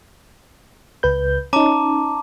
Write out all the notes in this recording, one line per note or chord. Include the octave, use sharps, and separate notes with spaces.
C#2 B4 G6
C#4 D#4 A5 A#5 D6